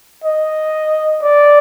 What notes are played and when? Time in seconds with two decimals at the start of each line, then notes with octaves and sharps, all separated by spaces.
0.24 D#5
1.23 D5